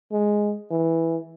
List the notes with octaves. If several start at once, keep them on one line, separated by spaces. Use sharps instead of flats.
G#3
E3